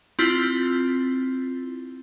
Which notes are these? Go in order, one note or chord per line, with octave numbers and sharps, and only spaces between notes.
C4 E4 F4 A6 G7